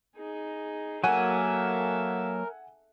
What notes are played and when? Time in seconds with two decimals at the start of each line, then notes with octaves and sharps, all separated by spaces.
0.16 D#4 G#4
1.04 F#3 A#3 A4 A#4 E5 F#5 G#5 D#7